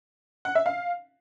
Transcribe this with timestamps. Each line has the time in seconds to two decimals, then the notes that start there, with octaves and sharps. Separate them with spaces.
0.45 F#5
0.55 E5
0.66 F5